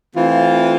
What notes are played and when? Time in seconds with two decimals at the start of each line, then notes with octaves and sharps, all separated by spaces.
0.15 E3 A3 C4 F4